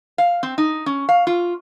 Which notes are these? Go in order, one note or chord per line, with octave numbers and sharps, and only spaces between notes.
F5
C4
D#4
C#4
F5
F4